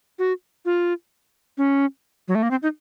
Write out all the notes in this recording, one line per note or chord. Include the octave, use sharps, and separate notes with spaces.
F#4
F4
C#4
F#3
A3
A#3
C4
D#4